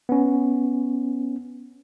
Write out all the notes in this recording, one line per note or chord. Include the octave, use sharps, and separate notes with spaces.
B3 C#4